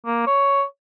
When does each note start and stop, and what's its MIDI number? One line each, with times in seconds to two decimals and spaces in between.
0.06 0.24 58
0.27 0.64 73